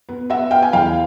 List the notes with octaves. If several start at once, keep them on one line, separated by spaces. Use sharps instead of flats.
B3
B3 E5 F#5
B3 F5 G5
G#5
E2 F5 G5